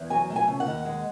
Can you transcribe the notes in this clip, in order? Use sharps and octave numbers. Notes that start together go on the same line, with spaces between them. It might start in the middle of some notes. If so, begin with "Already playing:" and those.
Already playing: E2
F#3 G#5
A3
G#5
C#3
F#5
D#2
G#3